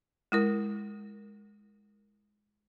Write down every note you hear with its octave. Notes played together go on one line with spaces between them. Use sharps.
G#3 E4 A#4